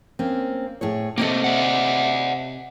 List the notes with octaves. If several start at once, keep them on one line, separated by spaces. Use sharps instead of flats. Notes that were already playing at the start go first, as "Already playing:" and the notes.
A#3 C4 C#4
A2 G#4 C#5
C3 A#3 A4 C5 D#5
D5 E5 F#5